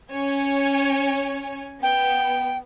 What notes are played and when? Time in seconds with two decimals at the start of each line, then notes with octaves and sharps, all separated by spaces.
0.13 C#4 C#5 G#5
1.83 B3 G5